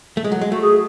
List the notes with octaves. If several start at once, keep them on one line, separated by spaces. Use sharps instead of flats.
A3
G#3
F#3
G#3
A3 F#4
G#4